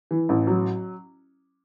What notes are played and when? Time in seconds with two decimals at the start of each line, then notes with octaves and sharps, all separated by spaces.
0.11 E3
0.29 A1
0.47 F#3